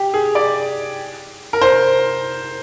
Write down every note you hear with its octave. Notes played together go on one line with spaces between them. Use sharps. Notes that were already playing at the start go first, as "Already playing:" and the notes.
Already playing: G4
G#4
D5
A#4
C5